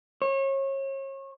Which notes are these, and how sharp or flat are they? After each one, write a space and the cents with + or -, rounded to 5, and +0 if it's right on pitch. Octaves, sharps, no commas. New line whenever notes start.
C#5 -35